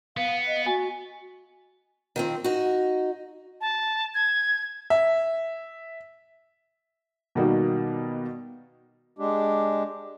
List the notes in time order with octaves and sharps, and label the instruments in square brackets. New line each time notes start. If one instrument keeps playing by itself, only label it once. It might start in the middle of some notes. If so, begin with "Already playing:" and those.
[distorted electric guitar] B3 [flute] F5
[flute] D#5
[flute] F#4 [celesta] G#5
[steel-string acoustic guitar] D#3 F3 C4
D#4 F#4
[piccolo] A5
G#6
[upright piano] E5
[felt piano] B2 D#3 G3 A#3 D#4 F#4
[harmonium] G#3 D4 G4